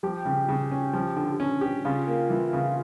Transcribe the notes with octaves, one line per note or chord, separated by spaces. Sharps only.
F3 G4
C#3
C#3
C#4
F3
D3
C#4
G4
C#3 F4
A#3
E3
C#3